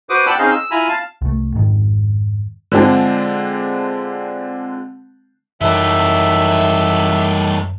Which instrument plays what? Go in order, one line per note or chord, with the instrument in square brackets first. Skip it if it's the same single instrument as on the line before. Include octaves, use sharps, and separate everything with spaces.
[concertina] F#4 B4 C5 D6 D#6
D5 F#5 G5 A5 B5 E6
C4 C#4 D#4 G#4 D#5 F5
E6
E4 F4 G#5 A#5 B5
F5 A5
[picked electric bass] C2 A3
F2 G#2 D#3
[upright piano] D3 F3 G#3 C4 D4
[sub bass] F#2 [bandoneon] D#3 F#3 A4 [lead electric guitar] E3 G3 [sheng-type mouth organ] E5